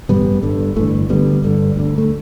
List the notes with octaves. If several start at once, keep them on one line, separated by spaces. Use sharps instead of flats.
A1 G2 D3 G3 B3
G1 G2 D3
G1 G2 D3 E3 A3
D2 D3 G3 B3
G1 G2 D3
D2 D3
A3